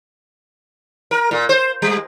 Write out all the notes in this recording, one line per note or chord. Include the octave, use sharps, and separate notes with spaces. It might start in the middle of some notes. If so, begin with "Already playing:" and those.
A#4
A#2
C5
G3